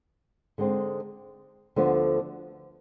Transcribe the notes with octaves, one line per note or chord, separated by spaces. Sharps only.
D3 G#3 C4 D#4
D2 D3 F3 B3